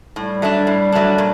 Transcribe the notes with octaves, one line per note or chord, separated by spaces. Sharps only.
A2 G3
F#3 A3 D4
A2
F#3 A3 D4
A#2